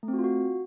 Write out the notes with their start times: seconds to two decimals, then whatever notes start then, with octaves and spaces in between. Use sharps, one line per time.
0.03 A3
0.08 C4
0.13 F#4
0.19 F4
0.24 F#4